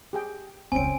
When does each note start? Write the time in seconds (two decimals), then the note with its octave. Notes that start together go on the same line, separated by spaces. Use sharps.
0.13 G4 G#4 G5
0.72 E1 C#2 C4 C#4 G#5 D7